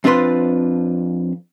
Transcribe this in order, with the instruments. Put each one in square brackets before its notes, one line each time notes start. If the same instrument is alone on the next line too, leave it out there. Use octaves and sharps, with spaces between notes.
[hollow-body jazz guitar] F2 C4 D4 F4 B4 C6